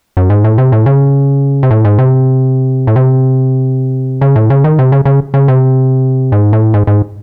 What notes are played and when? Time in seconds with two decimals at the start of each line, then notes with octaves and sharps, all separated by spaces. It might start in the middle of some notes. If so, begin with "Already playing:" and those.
0.17 F#2
0.30 G#2
0.44 A2
0.58 C3
0.72 A2
0.86 C#3
1.63 C3
1.71 A2
1.85 G#2
1.99 C3
2.87 A2
2.96 C3
4.21 C#3
4.36 A2
4.50 C#3
4.64 D#3
4.79 C3
4.92 C#3
5.05 C#3
5.34 C#3
5.48 C3
6.32 G#2
6.53 A2
6.74 G#2
6.87 G#2